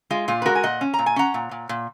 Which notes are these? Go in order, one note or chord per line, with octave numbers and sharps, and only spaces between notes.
G#3 F4
A#2 F4
B4
G#3 F#4 A#4
G#5
A#2 D#5 F#5
C#4
A#5
A#2
G#5
C#4 F#5 A#5
A#2
A#2
A#2